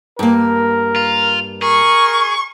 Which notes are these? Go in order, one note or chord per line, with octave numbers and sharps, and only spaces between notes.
G2 A#3 A#4
F4
G#4 A#4 C#6